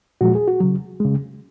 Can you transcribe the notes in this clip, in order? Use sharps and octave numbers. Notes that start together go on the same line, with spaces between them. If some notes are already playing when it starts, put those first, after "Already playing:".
A#2 F3 G#3 F#4
G#4
F#4
C#3 F#3
C#3 G#3